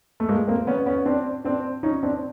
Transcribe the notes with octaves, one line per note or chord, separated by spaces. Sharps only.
A3
G#3 A#3
A#3 C4
B3 C#4
B3 C#4
C4 D4
C4 D4
C#4 D#4
C4 D4